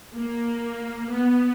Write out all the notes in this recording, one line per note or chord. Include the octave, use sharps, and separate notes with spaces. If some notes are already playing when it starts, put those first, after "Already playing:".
A#3
B3